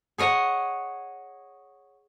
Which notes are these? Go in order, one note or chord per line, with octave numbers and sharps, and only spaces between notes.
G#4 C#5 D#5 F#5